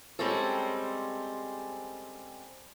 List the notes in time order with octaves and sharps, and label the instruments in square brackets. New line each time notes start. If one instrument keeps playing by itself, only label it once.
[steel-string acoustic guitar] G3 G#3 C4 C#4 A4